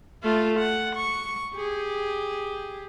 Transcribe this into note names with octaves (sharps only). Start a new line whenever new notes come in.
A3 F4
F#5
C#6
G4 G#4